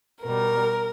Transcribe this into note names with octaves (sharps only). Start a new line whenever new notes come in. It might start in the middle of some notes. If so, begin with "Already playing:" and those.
B2 G3 A#4